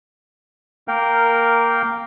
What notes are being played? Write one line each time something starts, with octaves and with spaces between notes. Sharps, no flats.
A#3 A#4 F5 G5